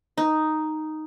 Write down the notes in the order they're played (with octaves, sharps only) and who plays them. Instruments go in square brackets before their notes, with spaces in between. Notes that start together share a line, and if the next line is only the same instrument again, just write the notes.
[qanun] D#4